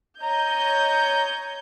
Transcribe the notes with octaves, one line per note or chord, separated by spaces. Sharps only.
C#5 D#5 A#5 G6